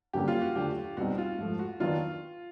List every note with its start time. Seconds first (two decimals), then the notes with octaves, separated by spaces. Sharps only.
0.13 G2 D3 F#3 A#3 C#4 G4
0.28 F4
0.42 F#4
0.55 D3 F#3 A3 D4 F4 G4
0.97 B2 G3 C4 D#4 F#4
1.18 F4
1.38 G#2 F3 A3
1.59 F#4
1.80 D#3 F#3 B3 D4 F4